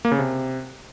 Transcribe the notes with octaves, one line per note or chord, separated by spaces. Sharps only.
A#3
C#3
C3